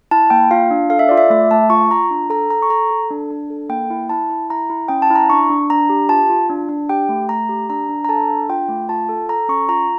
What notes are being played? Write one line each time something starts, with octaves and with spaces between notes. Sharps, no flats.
E4 A5
A#3 G5
F4 F5
D4
A4 F5
E5
F4 D5
E5
A3 E5
A3 A5
F4 C#6
F4 A#5
D4
A4 A#5
A4 A#5
C#6
A4 A#5
A4
D4
D4
A4
A#3 G5
E4
E4 A5
E4
E4 A#5
E4
C#4 G5
A5
E4
A#5
D4 C#6
D4
D4 A#5
G4
F4 A5
F4
D4
D4
G4 G5
A3
A3 A#5
G4
D4 A#5
D4
A#5
A4 A5
D4
F4 G5
A3
F4 A5
A4
A4 A#5
C#4 C#6
F4 A#5